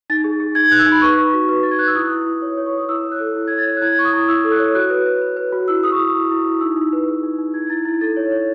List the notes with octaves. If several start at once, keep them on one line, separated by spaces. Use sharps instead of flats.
D#4 A6
G#4
G#4
D#4 G#6
D#4 F#6
E6
D#4
B5
B4 C#6
B4
F#4
B4
B4 A6
G#6
B4 F#6
E6
E4 D#6
E4
E4
C#5
C#5
C#6
E4
D#6
E4 E6
C#5
F#6
A4
E4
C#5 G#6
A6
C#5
F#6
E4 G#6
E4 C#6
D#6
E4
E4 E6
A4
F#6
C#5
F#4 F#6
B4
B4
B4
B4
F#4
E4 E6
G#4 D#6
C#6
E4
E4
E4
E4
D#4 E6
D#4
B4
G#4
D#4
D#4
E4 G#6
E4 A6
E4 A6
A4 A6
C#5
C#5